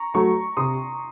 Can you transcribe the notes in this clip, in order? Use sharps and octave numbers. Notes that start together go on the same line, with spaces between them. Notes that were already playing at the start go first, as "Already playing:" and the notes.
Already playing: A#5 C#6
F#3 A3 A#5 C#6
C3 C6 D#6